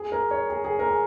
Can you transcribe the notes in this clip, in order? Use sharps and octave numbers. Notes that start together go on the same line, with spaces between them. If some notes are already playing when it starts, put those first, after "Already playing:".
Already playing: G#4
A#4
C#5
G#4
G#4
A#4
G#4